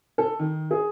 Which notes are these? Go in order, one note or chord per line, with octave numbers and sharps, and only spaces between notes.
A4
D#3
G#4